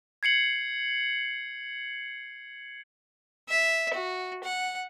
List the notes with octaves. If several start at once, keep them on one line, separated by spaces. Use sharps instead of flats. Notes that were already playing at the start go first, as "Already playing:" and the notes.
G#6 C7 C#7 F#7
E5
F#4
F#5